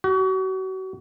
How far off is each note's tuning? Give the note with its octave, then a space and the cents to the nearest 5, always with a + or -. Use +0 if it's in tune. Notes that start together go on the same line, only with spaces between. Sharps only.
F#4 +35